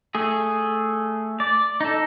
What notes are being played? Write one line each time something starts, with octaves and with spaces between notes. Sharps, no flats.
A3 G#4
D5
D#4 A4